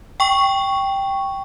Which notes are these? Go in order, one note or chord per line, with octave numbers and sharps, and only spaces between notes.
G5 C#6